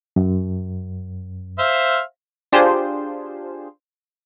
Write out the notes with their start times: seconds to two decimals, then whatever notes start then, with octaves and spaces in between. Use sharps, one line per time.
0.16 F#2
1.59 C5 E5 F5
2.53 D4 F4 G4 G#4 C5